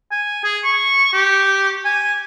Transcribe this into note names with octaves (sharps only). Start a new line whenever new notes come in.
G#5
G#4
C#6
G4
G#5